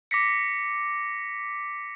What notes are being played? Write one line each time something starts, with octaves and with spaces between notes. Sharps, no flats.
D6 A#6 B6 C#7